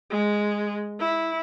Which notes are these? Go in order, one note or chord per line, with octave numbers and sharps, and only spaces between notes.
G#3
E4